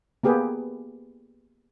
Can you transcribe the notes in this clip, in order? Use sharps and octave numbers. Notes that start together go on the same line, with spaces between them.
A#3 B3 G4 G#4 B4